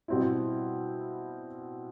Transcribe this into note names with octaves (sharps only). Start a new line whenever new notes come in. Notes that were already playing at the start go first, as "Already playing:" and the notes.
B2 G3 C4 E4